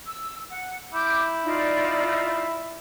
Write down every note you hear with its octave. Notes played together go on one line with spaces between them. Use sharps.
E6
F#5
E4 D6 G6
D#4 F4 D5